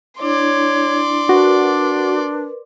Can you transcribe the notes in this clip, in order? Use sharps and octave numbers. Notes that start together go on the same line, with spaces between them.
D4 E4 C#5 D5 C6
D4 F#4 A#4 B4